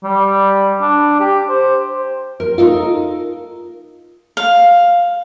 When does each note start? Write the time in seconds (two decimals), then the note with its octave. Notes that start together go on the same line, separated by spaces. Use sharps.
0.03 G3
0.81 D4
1.20 G4
1.49 C5
2.40 A#4
2.58 D#4 F4 A4 A#4
4.37 F5